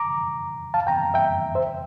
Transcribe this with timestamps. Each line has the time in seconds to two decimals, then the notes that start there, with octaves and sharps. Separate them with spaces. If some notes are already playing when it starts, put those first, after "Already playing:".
Already playing: A#5 D6
0.74 F5 A5
0.87 G5 A#5
1.14 E5 G5
1.55 C5 E5